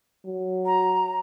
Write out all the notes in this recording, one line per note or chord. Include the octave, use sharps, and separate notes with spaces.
F#3
A#5